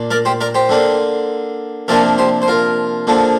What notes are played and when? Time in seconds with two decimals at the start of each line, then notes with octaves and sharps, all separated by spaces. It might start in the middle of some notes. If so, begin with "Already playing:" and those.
Already playing: A#2 A#3 D4
0.11 A#4 D5
0.25 G4 C5
0.41 A#4 D5
0.54 G4 C5
0.69 D3 A#3 D4
1.88 C3 F3 A#3 D4 A#4 D5
2.18 G4 C5
2.42 C5
2.48 F4 A#4
3.07 D3 F3 A#3 D4